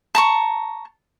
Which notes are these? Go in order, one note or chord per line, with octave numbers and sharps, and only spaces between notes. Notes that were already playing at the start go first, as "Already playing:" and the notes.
A5 A#5 C#6